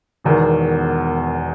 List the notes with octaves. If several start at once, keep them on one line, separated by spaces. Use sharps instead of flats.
E1 E2 D#3